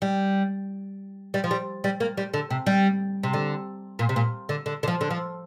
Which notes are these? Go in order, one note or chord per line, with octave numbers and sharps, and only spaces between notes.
G3
G3
F3
G3
G3
A#3
G3
D3
C3
G3
C3
D3
A#2
C3
A#2
D3
D3
D3
F3
D3
F3